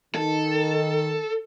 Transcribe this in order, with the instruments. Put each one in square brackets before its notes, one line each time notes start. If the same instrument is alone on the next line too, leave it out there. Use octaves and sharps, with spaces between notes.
[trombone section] D#3 [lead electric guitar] A4